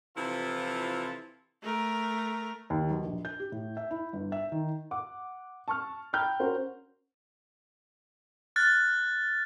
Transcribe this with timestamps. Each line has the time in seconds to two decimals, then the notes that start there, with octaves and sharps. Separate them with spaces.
0.17 C3 E3 F3 E4 F4 A4
1.62 A3 A#4
2.70 D#2
2.90 B1
3.04 A#1
3.25 G6
3.40 G4
3.52 A2
3.77 E5
3.91 E4
4.13 G1
4.32 E5
4.52 D#3
4.91 F#5 D6
5.68 A5 C#6 F6
6.13 G5 A#5 B5 F6 G6
6.40 C#4 F#4 A#4 C5
8.56 F6 F#6 A6